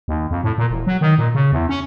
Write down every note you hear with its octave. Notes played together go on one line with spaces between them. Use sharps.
D#2
F2
A2
A#2
E1
F#3
D#3
A#2
C#3
E2
C#4